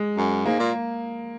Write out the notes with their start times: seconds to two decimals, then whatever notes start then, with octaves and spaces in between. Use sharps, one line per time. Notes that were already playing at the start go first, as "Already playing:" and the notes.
Already playing: G#3
0.17 F#2
0.46 G#2 A#3
0.59 A#2